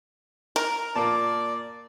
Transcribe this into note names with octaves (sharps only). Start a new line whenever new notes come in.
A#4
A#2 A#3 D5 A5